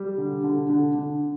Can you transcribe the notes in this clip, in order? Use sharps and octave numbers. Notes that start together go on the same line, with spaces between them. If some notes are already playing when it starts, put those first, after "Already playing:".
Already playing: G3
D3
D3
D3
D3